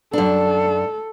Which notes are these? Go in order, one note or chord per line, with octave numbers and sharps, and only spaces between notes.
F#2 D4 A4